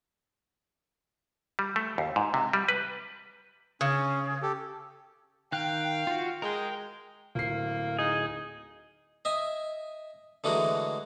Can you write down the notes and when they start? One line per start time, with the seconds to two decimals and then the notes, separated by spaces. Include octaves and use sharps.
1.59 G3
1.76 A3
1.98 D#2
2.16 G#2
2.34 C3
2.53 G3
2.69 B4
3.81 C#3 C#4
4.42 G4 A4
5.52 D#3 F5 G5 F#6
6.07 F4 F#4
6.42 G#3 A#4 G5
7.35 D1 A#3 C7
7.99 D#4 G#4
9.25 D#5 E5 G#5
10.44 D3 E3 G#3 A3 F#4 A#4